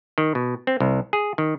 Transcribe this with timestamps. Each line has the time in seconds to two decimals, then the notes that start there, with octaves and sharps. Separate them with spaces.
0.18 D#3
0.35 B2
0.67 C4
0.80 C2
1.13 G#4
1.38 D#3